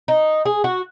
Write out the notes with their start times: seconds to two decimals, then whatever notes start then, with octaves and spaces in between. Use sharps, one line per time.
0.08 D#4
0.45 G#4
0.64 F#4